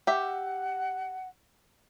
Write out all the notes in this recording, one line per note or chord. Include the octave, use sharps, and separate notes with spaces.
G4 E5 F#5